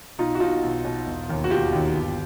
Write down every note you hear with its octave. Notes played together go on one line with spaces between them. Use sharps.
B1 D#4 F4
F#4
B2 D#4 F4
B1
B2
E1
D#2 D#3
F#4
E1 F4 G4
D#2 D#3
G1